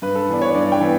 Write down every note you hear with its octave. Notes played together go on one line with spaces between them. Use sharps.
G2 B4
A4
E3 B3 D4
C#5
G2 D5
G5
E3 B3